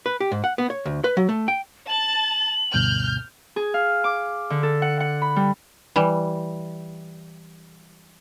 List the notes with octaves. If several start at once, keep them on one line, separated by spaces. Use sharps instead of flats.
B4
G4
G#2
F#5
B3
C#5
D2
B4
F#3
A3
G5
A5 A6 F#7
D2 G2 B2 F6 G6
G#4
F5
D6
D3
A4
F#5
F#5
B5
G3
E3 G3